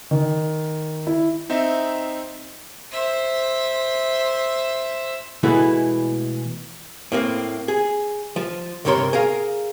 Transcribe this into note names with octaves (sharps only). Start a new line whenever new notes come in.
D#3
E4
C4 D#4 E5
C5 E5
B2 E3 G#3 A3 E4 B4
A2 A#3 C4
G#4
F3
C2 G2 C3 A#4 C#5 C6
G#4 A#4 F5